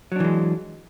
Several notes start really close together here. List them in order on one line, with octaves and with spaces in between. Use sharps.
F#3 D4 E3 G#3